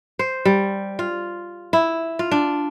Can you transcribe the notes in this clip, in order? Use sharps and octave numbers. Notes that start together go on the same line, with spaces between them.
C5
G3
F4
E4
F4
D4